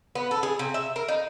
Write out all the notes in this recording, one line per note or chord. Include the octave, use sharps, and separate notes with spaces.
B3
A4
G#4
C3
E5
A#4
D#4